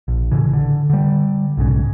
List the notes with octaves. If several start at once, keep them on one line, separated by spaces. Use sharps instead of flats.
A#1
A2 C#3 E3
D3
D3 G3
B1 G#2 C#3